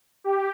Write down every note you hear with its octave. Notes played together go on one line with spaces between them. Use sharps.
G4